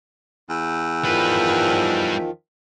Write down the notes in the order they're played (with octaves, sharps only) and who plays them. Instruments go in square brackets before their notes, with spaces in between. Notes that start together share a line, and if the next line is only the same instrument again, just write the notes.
[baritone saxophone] E2
[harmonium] D#3 F3 [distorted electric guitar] G3 B4